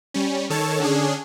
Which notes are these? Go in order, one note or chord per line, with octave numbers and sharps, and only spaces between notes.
G3 C#4
D#3 A4 C#5 A5
D3 C#4 D4 G#4